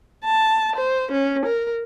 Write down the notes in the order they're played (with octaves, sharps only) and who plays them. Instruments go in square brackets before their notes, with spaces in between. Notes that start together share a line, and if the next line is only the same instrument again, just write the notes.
[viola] A5
C5
C#4
A#4